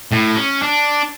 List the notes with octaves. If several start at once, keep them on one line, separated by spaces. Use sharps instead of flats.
A2
C#4
D4